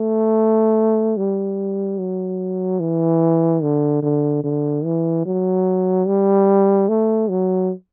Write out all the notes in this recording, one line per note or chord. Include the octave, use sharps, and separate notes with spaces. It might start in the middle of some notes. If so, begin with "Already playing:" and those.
Already playing: A3
G3
F#3
E3
D3
D3
D3
E3
F#3
G3
A3
F#3